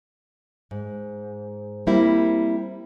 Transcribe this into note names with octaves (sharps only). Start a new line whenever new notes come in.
G#2
G3 A#3 C4 E4